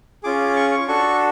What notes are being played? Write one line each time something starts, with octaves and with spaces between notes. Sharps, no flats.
C#4 F4 G#4 D6
C#6
C#6
D4 F#4 A4 C#6